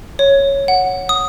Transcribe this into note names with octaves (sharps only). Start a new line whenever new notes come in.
C#5
F#5
D#6